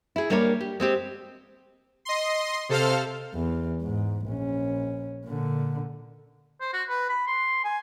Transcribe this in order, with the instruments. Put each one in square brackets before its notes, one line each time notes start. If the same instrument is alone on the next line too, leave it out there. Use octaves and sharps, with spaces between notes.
[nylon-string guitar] E4 G#4
G3 A#3 D4 A#4 C#5
G4
G#3 C4 G4
[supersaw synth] D#5 C6
C3 A4 C5 F5 F6
[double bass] E2
G#2
A#1 C#4
A#2 D3
[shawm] C5
F#4
B4
B5
C6
G#5